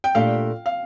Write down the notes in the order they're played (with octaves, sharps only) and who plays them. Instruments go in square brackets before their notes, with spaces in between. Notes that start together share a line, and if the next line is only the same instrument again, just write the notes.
[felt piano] G5
[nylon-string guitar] A#2 A3 D4 G4 [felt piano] F5
[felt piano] F5